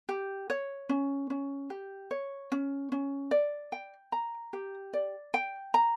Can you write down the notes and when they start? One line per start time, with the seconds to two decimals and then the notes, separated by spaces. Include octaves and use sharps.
0.09 G4
0.50 C#5
0.89 C#4
1.30 C#4
1.70 G4
2.11 C#5
2.52 C#4
2.92 C#4
3.31 D5
3.72 G5
4.12 A#5
4.53 G4
4.93 D5
5.34 G5
5.74 A#5